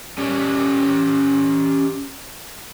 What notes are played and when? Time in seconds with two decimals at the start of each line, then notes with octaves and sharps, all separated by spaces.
0.18 C#4 G4 C#5 D5